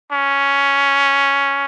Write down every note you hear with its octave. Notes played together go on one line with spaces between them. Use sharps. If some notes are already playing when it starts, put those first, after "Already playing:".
C#4